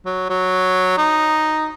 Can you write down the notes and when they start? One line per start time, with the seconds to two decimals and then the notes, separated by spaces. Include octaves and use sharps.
0.05 F#3
0.29 F#3
0.97 D#4